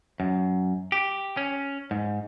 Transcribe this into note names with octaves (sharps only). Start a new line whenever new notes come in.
F#2
G4
C#4
G#2